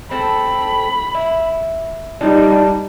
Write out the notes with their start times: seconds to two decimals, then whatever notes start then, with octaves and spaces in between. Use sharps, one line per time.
0.11 C4 A4 B5
1.15 E4
2.21 G3 D4 D#4